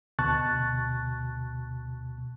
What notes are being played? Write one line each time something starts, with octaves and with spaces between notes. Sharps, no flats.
D2 B2 A5 C#6 F#6 A6